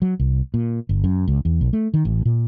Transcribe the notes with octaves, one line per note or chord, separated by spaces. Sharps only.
F#3
C2
A#2
G1
F#2
C#2
E2
B1
A3
D#3
A1
A#2